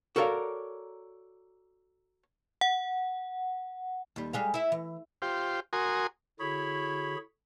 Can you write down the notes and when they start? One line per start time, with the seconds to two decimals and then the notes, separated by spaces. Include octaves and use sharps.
0.16 F#4 A4 A#4 C#5 D5 F5
2.61 F#5
4.16 D#2 G3
4.33 G3 G#3 F5
4.54 E4 E5
4.72 E3
5.22 F4 G4 C5
5.73 F#4 A#4 G#5 C6 D#6
6.40 D3 E4 F#4 G#4 C#5 B5